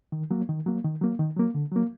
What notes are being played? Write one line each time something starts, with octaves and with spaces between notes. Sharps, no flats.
D#3
F#3 A#3
D#3
F#3 A#3
D#3
F#3 A#3
D#3
F#3 A#3
D3
F#3 A#3